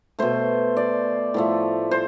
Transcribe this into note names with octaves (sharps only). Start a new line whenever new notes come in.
B2 A3 C5
D5
A2 F3 A3
C5